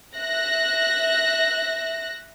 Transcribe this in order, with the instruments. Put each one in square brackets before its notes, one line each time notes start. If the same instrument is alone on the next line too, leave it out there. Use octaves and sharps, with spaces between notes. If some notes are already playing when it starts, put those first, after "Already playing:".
[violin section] E5 F#6 A#6